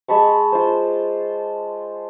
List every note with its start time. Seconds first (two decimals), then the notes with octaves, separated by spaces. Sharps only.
0.08 G#3 A5 B5 C#6
0.52 F4 C5